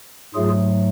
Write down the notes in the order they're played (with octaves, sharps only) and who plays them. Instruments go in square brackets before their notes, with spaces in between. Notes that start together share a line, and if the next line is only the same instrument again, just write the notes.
[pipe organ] G#2 F#3 A3 F4 G#4